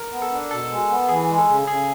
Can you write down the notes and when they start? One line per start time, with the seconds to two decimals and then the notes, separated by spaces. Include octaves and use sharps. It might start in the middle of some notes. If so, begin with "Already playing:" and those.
Already playing: A#4
0.12 B3
0.22 A4
0.32 D4
0.51 B2 A4
0.70 G#3
0.89 B3
1.09 E3 G#4
1.29 G#3
1.39 A4
1.48 C#3
1.67 C#3 G#4